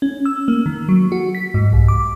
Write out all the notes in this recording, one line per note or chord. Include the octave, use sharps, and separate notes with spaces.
C#4
E6
A#3
D#3
F#3
F#4
B6
G#2
C2
D6